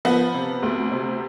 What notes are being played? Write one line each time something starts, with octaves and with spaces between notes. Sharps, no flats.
F3 B3
C3
D2
C3